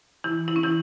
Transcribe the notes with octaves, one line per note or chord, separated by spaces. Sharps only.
E3 E4
E4
C#4
E3 E4